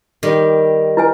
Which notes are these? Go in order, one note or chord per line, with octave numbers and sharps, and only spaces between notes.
D#3 G3
E4 B4 G#5